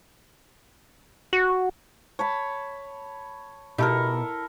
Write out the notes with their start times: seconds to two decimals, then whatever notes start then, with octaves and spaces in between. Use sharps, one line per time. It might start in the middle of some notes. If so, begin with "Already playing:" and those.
1.33 F#4
2.19 C#5 A5 B5
3.78 B2 D#4 E4 G4 A4 A#4